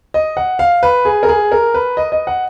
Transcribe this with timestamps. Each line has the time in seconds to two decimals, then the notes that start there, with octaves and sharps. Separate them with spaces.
0.14 D#5
0.37 F#5
0.59 F5
0.83 B4
1.05 G#4
1.23 A#4
1.29 G#4
1.52 A#4
1.74 B4
1.97 D#5
2.12 D#5
2.27 F#5